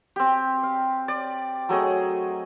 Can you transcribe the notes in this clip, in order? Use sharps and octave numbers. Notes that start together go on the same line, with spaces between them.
C4 G4
F5
D5
F#3 A3 G#4 D#5